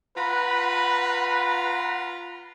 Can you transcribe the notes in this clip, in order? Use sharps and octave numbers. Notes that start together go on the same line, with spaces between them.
F4 B4 F#5 A#5 B5